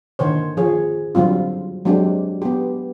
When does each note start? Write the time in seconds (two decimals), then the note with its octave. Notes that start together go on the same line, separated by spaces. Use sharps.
0.19 D3 D#3 C5 C#5
0.57 F3 G#4 C#5
1.15 D3 F#3 G3 C4 F4
1.85 F#3 G#3 C4 D4 G4
2.42 B3 G4